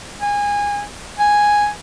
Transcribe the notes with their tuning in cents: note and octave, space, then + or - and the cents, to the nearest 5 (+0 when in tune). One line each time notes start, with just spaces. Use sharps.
G#5 -25
G#5 -5